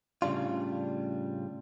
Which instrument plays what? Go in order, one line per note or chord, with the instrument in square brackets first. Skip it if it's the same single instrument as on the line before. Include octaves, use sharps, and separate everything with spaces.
[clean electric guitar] A2 C#3 G3 D4 F4